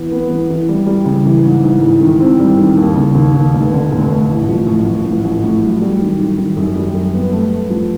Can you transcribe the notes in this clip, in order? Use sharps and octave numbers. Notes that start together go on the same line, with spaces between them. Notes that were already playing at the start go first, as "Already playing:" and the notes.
Already playing: E3 B3
B3
E3
E3
G3
G3
C#3
E3
G#2
G#2
E3
D#3
C4
G3
D#3
D#2
C#3
D#2
D#2
F1
D3
F1
F1
A1
F3
A1
F3
A1
A1
A2
F#3
G3
D#3
D#3
D#3
F#2
G3
F#2
B3
A3
A3
F3